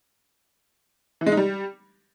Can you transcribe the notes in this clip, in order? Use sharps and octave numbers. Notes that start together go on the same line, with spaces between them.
E3
G#3
D#4
G3